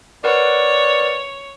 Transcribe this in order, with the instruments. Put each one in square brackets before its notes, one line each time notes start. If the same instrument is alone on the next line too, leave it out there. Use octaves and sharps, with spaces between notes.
[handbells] A#4 B4 F#5 [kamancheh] C#5 [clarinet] D5